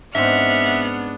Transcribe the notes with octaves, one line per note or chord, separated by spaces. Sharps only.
G#2 B3 C4 D4 E5 F#5 F6